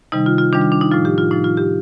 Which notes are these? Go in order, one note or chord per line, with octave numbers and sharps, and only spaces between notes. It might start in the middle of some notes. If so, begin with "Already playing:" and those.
C3 D#3 G3 D#4
F4
F4
C3 D#3 G3 D4
F4
D4
D#4
A2 F3 F4
G4
F4
A2 F3 D#4
F4
G4